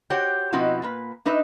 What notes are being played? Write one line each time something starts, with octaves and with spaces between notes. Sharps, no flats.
F#4 G4 C5 C#5 F#5 G5
B2 F3 C4 D#4 E4 F#4
A#2 A#3 B4
D4 D#4 B4 D#5 E5